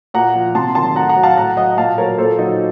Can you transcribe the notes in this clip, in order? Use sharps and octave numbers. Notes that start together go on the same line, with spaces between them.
A#2 F#5 A#5
F3
C3 A5 C6
D#3 F#3 A5 C6
A2 F#5 A#5
F#5 A#5
F#3
F5 A5
A2 F#5 A#5
F#3 D#5 F#5
A#2 F5 A5
F#3 A#4 C#5
A#2 A4 C5
F#3 D#4